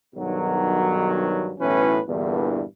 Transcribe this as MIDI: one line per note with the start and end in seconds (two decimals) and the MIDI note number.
0.15 1.53 35
0.15 1.53 43
0.15 1.53 51
0.15 1.53 54
1.60 1.99 35
1.60 1.99 45
1.60 1.99 52
1.60 1.99 61
1.60 1.99 71
2.08 2.62 40
2.08 2.62 43
2.08 2.62 46
2.08 2.62 50
2.08 2.62 52